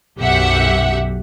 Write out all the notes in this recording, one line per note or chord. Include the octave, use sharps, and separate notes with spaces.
B1 F#2 G4 E5 F#5